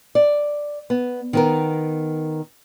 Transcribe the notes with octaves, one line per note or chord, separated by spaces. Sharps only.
D5
B3
D#3 B3 A#4